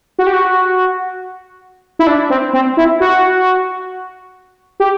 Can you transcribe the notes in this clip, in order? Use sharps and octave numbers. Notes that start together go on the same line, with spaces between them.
F#4
G4
F#4
E4
D4
C4
C4
E4
F#4
G4